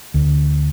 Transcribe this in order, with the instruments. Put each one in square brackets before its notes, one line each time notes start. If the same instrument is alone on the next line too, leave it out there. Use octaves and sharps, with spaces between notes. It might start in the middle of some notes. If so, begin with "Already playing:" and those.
[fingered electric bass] D2